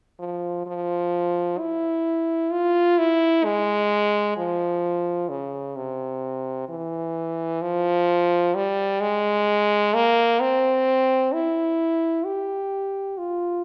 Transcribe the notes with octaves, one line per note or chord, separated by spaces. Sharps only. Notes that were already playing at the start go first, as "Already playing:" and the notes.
F3
F3
E4
F4
E4
G#3
F3
C#3
C3
E3
F3
G3
G#3
A#3
C4
E4
G4
F4